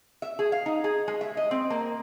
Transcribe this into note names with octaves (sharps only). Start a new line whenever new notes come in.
E5
G#4
F5
D#4
G#4
G#3
E5
D#5
C4
A#3